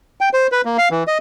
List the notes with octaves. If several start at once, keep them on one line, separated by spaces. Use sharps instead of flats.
G5
C5
B4
A#3
F5
E3
D#5